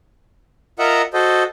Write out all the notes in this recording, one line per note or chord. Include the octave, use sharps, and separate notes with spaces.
F4 A#4 D#5 E5 F#5
F#4 A4 C5 D#5